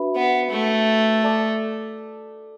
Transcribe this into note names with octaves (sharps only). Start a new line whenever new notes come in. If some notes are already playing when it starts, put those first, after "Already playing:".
Already playing: D4 F#4 B4 E5 B5
B3
A3
A4 D5 A5 D6